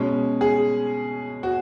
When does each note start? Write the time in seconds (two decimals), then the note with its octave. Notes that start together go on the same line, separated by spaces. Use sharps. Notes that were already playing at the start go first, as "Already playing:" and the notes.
Already playing: B2 G#3 C#4
0.41 G#4
1.43 F#4